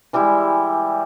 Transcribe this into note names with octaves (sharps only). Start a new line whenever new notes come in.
E3 G3 G#3 E4